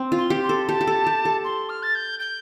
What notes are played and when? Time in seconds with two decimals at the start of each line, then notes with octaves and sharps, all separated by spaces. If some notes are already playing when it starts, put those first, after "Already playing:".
Already playing: C4
0.12 F4
0.18 C6
0.30 G4
0.43 C6
0.49 A4
0.68 G4 A5
0.81 G4
0.87 A4
1.06 G4
1.25 A4
1.44 C6
1.69 F6
1.83 A6
1.95 G6
2.20 G6